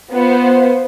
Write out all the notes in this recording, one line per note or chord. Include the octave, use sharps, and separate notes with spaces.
B3 F4 C5